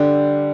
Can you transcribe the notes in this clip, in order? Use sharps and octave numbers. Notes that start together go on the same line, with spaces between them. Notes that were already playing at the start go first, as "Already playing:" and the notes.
Already playing: D3 G3